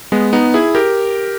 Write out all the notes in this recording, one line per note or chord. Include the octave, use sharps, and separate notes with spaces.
G#3 B3
B3 D#4
E4 G#4
G4 A#4